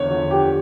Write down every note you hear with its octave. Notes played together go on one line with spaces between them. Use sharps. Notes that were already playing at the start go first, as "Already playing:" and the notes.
Already playing: E2 D3 C#5
D3 F3
G4